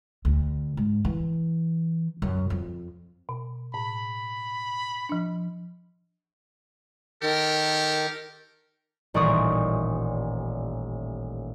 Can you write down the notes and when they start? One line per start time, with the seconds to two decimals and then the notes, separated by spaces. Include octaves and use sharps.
0.25 D2
0.77 G#2
1.05 E3
2.22 F#2
2.50 F2
3.29 B2
3.74 A2 B5
5.09 F3 D4
7.23 D#3 G4 A4 A#4
9.14 D#1 A1 D5 C#6 D#6